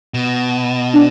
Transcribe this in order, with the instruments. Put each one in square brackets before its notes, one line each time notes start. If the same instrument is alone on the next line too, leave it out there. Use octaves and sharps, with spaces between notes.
[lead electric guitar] B2
[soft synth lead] D4